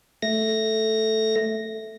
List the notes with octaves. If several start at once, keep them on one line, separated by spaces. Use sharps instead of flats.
A3 A#6